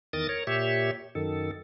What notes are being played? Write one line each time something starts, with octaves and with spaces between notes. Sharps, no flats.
E2 D#3 A#4 D#6 A6
A#4 C#5
A#2 G4 C#5 E5
F#2 D#3 A4